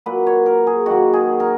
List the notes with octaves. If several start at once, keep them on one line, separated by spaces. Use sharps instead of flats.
A#2 F#3 A#3 B4
C#5
A#4
G#4
D#3 F#3 A#3 F#4
G#4
A#4